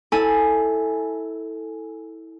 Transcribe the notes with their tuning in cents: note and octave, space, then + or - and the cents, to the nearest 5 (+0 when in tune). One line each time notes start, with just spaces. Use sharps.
E4 -20 A4 +5 G#5 +0